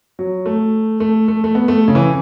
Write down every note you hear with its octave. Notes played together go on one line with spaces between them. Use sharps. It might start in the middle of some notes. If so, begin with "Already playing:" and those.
F#3
A3
A3
A3
A3
B3
A3
C#3
E3